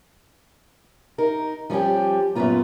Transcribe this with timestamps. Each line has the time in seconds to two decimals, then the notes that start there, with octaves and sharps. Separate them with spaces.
1.18 D#4 A#4
1.70 F3 G3 B3 C#4 G4
2.35 F#2 A#2 F3 B3 F4 A#5